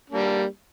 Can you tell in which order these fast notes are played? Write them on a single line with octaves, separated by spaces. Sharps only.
D4 A#3 G3